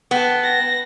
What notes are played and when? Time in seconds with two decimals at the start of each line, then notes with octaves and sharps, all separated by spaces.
0.11 B3 G5 A5
0.43 A#6